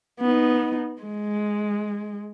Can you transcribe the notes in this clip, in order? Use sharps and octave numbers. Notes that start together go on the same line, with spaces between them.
B3 D#4
G#3